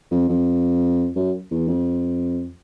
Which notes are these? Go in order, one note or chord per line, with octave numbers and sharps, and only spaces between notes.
F2
F2
F#2
E2
F2